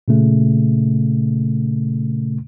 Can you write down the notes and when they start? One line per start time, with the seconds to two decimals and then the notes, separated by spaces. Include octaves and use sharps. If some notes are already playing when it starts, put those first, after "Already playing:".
0.08 A#2 C#3 A3